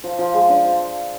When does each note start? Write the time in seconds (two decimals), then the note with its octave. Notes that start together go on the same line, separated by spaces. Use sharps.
0.04 F3
0.19 F3
0.34 G#3
0.49 D4
0.65 F3